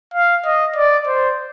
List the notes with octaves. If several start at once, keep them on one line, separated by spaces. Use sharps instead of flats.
F5
D#5
D5
C5